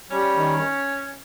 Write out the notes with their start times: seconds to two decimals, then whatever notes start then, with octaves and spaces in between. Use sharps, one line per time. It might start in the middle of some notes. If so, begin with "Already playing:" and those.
0.11 G3 C#4
0.36 D#3